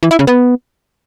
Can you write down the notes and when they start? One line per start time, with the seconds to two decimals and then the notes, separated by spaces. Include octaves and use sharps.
0.03 E3
0.11 E4
0.19 C#3
0.27 B3